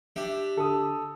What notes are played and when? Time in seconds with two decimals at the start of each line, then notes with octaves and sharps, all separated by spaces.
0.16 D4 G4 E5
0.57 D3 A4 D#6